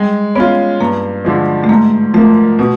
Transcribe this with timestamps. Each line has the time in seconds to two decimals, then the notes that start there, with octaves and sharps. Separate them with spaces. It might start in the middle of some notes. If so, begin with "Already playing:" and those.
Already playing: G3 G#3
0.35 B3 C#4 F4
0.81 G2 A#3
1.25 D3 F3 G#3
1.64 A3
1.69 G#2 A#3
2.14 F3 A3 A#3
2.59 B2